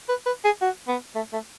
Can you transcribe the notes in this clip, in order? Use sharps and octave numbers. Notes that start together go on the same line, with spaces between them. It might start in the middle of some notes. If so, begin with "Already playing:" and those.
B4
B4
G#4
F#4
B3
A3
A3